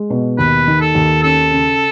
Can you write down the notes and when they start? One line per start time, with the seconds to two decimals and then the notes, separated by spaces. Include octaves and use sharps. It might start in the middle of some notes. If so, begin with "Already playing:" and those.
Already playing: G#3
0.10 B2
0.38 D#2 B4
0.67 D#3
0.81 A4
0.95 D#2
1.23 C#4 A4
1.51 C#3